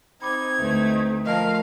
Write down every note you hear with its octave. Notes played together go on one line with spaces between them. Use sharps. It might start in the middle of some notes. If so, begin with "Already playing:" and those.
C4 D#4 B5 D6 G#6
D2 A3 A4 B4 E5
F3 A3 A#4 D#5 F5 A5